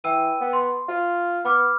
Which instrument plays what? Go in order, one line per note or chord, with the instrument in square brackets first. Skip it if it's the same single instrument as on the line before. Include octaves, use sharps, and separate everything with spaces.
[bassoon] E3 [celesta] G5 E6 D#7
[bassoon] B3
[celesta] C6
[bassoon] F4
[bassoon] B3 [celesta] B5 D6 F6